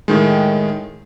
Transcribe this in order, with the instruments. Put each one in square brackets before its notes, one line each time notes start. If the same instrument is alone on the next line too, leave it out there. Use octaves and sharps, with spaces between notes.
[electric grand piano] A2 D#3 G#3